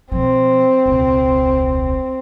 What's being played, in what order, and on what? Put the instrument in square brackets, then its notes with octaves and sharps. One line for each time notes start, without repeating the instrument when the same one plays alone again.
[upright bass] B2 F3 [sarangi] C4
[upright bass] E1 C#2